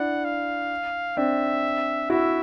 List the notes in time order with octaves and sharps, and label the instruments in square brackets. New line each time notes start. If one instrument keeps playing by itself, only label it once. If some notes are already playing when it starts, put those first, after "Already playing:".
Already playing: [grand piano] D4 E4 [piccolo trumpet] F#5
[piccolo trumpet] F5
[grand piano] C4 D4 [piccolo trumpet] E5
[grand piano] E4 F#4 [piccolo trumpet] E5